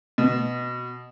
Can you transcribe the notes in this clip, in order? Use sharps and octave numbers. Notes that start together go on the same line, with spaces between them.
B2